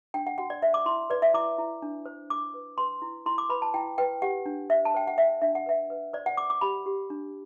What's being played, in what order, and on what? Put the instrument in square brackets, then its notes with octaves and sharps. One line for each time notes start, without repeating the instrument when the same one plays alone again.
[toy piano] D4 G5
F#5
F#4 F#5
D5
C5 E5
D6
E4 C6
B4 D5
E5
E4 D6
E4
D4
C5
D4 D6
B4
B4 C6
E4
E4 C6
D6
B4 B5
A5
E4 G5
B4 G5
G4 F#5
D4
C5 E5
A5
C5 G5
F#5
C5 E5
D4 E5
F#5
B4 E5
B4
C5 D5
F#5
C5 D6
D6
G4 B5
G4
D4